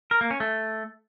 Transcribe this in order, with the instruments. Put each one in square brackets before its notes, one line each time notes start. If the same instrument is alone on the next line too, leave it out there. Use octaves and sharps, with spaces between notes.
[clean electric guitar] A#4
A#3
C#4
A3